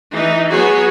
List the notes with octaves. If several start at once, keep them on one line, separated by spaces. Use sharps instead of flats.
E3 D#4
F#3 B3 F#4 G#4 C#5